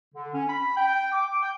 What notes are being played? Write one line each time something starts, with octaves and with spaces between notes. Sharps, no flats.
D3
C#4
B5
G5
D6
G5